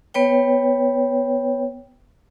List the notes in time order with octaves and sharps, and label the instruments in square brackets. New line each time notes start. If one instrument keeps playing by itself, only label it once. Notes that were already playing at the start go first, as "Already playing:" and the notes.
[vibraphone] B3 B4 C#5 G5